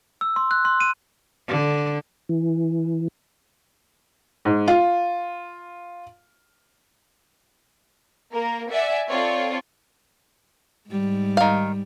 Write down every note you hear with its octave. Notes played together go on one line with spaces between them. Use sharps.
E6
C6
F#6
C6
D#7
D3
E3
G#2
F4
A#3 A#4
D5 E5 F#5 G#5
C4 F4 A4 C#5 D5
G#2 G3
D#3 F5